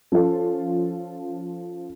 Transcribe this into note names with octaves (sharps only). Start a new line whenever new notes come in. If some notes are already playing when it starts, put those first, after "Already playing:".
F3 C#4 F4 A4